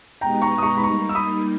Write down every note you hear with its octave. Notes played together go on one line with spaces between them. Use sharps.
B2 G#3 D#4 G4 B4 G5 A#5
A#5 C#6
D#6
A#5 C#6
B5
G3 A#3 D#4 A#5 C#6
E6
B5 D#6